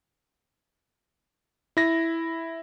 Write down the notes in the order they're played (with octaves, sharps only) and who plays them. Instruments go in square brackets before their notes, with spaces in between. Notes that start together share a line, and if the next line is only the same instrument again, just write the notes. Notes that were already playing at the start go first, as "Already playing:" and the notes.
[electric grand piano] E4 A#6